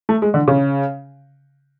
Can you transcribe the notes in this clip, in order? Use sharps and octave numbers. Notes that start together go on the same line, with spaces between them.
A3
G#3
D3
C#3